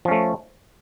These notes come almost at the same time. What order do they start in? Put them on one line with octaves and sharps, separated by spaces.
F3 C#4 A3